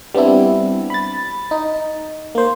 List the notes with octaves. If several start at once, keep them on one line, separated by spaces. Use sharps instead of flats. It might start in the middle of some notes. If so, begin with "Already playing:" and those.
G3 B3 C4 D4 E4
B5 A6
D#4
A#3 C5